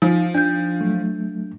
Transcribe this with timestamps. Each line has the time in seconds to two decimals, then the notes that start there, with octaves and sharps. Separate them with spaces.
0.02 F3 D#4
0.34 D4 G6
0.81 F#3 A3